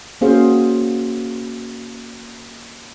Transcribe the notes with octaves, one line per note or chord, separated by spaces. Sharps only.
A#3 C#4 F#4 G#4 C5 F5